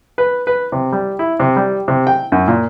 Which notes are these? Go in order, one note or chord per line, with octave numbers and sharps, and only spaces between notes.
B4
B4
C3
G3
E4
C3
G3
C3
G5
F#2
A#2